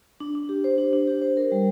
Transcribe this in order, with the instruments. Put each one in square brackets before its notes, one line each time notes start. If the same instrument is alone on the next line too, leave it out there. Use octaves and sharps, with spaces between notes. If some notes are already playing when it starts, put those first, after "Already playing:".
[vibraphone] D4
D4
G4
C5
D4
D4
G4
C5
A#4
G3